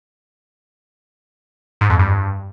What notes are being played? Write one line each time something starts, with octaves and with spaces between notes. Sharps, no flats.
G#2
F2
G2